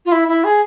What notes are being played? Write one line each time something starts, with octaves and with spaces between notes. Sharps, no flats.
F4
E4
E4
G#4